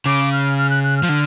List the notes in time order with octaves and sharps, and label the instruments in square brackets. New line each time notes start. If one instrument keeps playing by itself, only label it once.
[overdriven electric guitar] C#3 [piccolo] D6
[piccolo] F6
F6
F#6
F#6
F6
[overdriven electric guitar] F3
D3